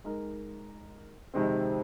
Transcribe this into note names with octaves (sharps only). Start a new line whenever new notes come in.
G#3 D#4 A#4
F2 C3 D#3 G#3 C4